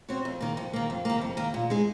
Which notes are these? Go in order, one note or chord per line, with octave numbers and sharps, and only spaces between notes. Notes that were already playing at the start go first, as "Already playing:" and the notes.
C4 F#4 C#5
F2
D#3 A#3
F2
D#3 A#3
F2
D#3 A#3
F2
D#3 A#3
A#2
G#3 D#4 G#4